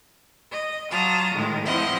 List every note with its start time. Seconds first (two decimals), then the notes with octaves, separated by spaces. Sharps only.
0.50 D#5
0.90 F#3 F4 A5 A#5 D#6
1.33 A2 D#3 G#3
1.64 E2 F3 C4 E4 D#5 F#5